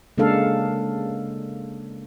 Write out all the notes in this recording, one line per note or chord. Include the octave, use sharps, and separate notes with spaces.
C#3 G#3 A#3 D4 A4 F5